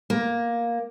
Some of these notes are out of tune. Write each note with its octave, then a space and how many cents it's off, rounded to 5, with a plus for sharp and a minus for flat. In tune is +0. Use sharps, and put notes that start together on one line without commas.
A#3 +10